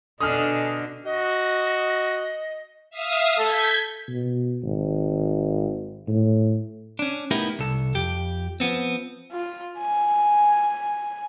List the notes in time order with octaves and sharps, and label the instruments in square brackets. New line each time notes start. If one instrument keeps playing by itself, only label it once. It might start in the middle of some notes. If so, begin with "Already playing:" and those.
[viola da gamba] B2 D4 D#5 [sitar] D3 [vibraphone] A4 G#5 [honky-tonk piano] D#6 F6
[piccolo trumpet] F#4 [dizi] D#5
[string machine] E5 F5 D#6
[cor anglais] A4 [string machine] G6 G#6 B6
[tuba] B2
G#1
A2
[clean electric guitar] C#4 D4
A3 B3 D#4 E4 G4 A#4
C2 A4
F2 G4
F3 B3 C4
[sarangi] F4
G#5